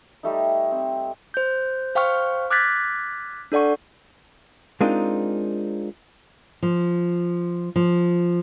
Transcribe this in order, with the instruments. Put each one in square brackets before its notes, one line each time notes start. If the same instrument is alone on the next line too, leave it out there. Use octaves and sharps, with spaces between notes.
[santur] G3 A3 D#4
C4
[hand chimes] C5 G6
C5 F5 G5 C#6 F6
D6 F6 F#6 G#6 A6 B6
D4 A4 D5 F#5 C#6
[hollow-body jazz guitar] G#3 C4 D4 D#4 F4 A#4
[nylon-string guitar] F3
F3